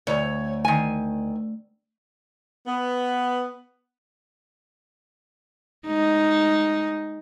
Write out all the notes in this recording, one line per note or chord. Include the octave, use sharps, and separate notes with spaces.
D2 C#5
D#3 G#5
B3
G#3 D#4